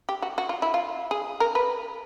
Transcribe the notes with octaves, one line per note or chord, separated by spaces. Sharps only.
G4
F#4
F#4
F4
E4
F4
G#4
A#4
B4